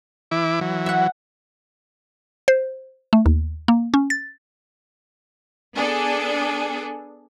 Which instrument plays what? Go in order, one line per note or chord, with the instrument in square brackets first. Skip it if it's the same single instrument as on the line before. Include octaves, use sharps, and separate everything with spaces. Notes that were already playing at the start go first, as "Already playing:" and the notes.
[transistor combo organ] E3 E4 D6
E3 F#3
[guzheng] E5 F#5
[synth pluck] C5
A3
D#2
A#3
C#4
A6
[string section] B3 D4 G#4 A4